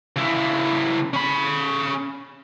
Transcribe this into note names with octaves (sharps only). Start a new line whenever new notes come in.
C#3 E4
C#4 B5